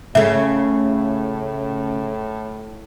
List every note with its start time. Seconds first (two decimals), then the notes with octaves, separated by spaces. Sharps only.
0.15 A2 C#3 A3 E5